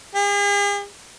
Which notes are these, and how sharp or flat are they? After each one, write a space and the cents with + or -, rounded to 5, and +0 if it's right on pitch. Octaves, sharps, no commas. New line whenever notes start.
G#4 -45